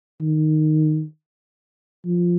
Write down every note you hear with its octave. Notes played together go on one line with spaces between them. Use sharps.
D#3
F3